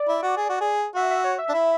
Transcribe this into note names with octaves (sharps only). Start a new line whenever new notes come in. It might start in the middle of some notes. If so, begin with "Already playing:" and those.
Already playing: D5
E4
F#4
G#4
F#4
G#4
F#4 E5
E5
C#5
E5
D4
E4